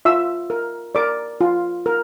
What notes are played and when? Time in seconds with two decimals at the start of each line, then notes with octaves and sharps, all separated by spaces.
0.05 F4 E5 E6
0.50 A#4
0.95 A#4 D5 D6
1.41 F4
1.86 A#4